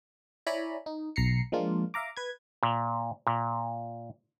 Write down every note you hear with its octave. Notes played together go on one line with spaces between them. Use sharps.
E4 C#5 D5 G#5 A#5 B5
D#4
B1 A#5 C7 C#7
F3 G#3 A#3 D4 F4
E5 F5 A#5 D6
B4 G#6
A#2
A#2